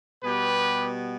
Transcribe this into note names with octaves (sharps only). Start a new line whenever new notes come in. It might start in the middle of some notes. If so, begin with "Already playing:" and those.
B2 G3 B3 G4 B4